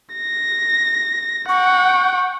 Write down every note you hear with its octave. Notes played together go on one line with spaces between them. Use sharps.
A#6
F#5 G5 C#6